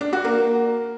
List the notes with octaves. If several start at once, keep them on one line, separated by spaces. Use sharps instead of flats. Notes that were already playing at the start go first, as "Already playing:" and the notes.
D4
F#4
A#3